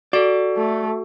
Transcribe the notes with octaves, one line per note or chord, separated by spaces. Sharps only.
F#4 A4 D5
A3